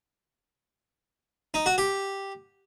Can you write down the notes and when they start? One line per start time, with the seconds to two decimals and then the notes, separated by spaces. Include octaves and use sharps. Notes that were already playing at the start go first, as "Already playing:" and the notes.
1.54 D#4
1.66 F#4
1.78 G4